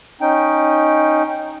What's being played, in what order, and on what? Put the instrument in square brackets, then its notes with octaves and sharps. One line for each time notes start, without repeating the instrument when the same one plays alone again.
[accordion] C#4 D#4 G5